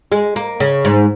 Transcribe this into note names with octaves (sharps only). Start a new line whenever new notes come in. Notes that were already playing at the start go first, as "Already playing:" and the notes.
G#3
A#3
C#3
G#2